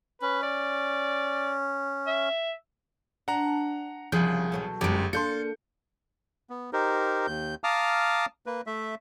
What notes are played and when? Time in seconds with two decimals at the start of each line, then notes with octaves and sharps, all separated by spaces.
0.22 C#4 B4
0.43 D5
2.07 E5
3.28 D4 F#5 A#5
4.12 C2 C#3 F3 G3 G#4 G6
4.52 B2 F#3 A4
4.81 G1 F#2 G#3 G4
5.13 A#3 D4 A4 C6 G6 C#7
6.50 B3
6.73 D#4 G4 A#4 C5
7.27 D#2 G6
7.64 F5 A5 A#5 D6 D#6 F6
8.46 A#3 B4
8.67 A3 E5